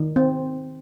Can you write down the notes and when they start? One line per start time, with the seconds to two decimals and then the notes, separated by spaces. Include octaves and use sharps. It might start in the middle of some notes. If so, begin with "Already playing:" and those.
Already playing: D#3
0.16 C4